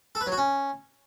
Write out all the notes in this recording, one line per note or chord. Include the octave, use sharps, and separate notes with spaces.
A4
B4
F#3
F#4
C#4